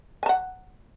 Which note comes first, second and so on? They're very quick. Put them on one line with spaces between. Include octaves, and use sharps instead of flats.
G#5 A5 F#5